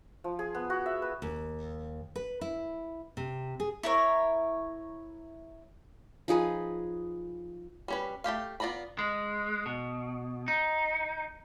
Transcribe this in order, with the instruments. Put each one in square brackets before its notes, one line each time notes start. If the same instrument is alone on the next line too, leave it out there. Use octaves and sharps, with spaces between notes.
[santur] F3
G#4
B3
F#4
E5
B4
[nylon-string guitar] D#2
B4
E4
C3
G#4
[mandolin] E4 A#4 C#5
[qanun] F3 D#4 G#4 B4
[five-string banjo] G3 C#4 B4
A3 C4 G4 F5
B3 F4 D5 A#5 B5
[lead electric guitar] G#3
B2
D#4